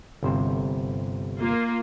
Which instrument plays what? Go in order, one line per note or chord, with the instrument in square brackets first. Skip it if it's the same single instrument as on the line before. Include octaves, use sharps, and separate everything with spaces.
[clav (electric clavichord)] G1 C3 C5
[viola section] A#3 F4